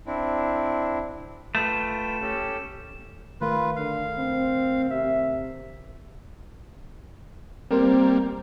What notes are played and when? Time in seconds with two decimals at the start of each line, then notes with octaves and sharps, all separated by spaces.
0.06 C4 D4 E4
1.55 A3 F4 B4 G5 E7
2.22 C#4 G4 A4
3.41 D#3 A3 F4 A#4 B4
3.76 D3 F5
4.17 C4
4.90 C3 E5
7.71 G3 A#3 C4 A#4 C5